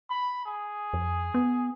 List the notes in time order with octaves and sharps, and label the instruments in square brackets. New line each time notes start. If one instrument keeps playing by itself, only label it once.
[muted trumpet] B5
G#4
[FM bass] F2
B3